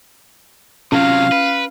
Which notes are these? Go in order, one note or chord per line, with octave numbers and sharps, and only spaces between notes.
C3 F#3 C#4 F5
B4